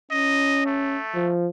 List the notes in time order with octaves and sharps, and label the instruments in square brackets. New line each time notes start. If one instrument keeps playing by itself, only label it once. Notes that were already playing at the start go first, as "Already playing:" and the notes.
[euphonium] C#4 [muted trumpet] D#5
[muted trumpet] A3
[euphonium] F3